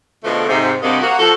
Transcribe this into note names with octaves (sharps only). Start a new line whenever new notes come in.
B2 D3 E3 F3 G#3 A3
G#2 C3
G2 C3 G3 A#3 F#4 D#5
A#3 F#4
F3 F#4 A4